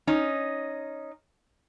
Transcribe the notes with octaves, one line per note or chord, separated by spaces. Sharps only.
C#4 D#4